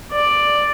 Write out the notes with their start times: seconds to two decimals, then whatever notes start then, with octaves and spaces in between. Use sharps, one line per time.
0.11 D5